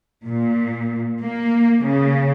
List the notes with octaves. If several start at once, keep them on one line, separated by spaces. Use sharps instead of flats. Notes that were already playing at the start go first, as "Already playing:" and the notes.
A#2
A#3
C#3